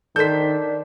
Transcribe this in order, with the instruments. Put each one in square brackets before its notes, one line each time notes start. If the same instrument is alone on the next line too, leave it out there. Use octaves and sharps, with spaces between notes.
[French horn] D#3 [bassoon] D4 [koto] A4 C5 [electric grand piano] G6 B6